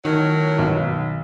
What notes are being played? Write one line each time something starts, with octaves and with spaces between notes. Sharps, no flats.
A2 D#3 F#3 A#4
B1